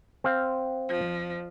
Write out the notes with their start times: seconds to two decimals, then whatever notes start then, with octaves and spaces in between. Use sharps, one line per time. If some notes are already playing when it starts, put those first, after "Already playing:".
0.24 C4 F5
0.89 F2 F3